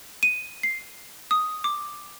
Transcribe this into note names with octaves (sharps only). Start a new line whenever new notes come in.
D#7
C7
D#6
D6